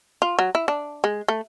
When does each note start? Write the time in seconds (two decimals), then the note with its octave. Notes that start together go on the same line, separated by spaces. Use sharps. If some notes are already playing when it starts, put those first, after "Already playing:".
0.22 F4
0.39 F#3
0.55 E4
0.68 D4
1.04 G#3
1.28 A3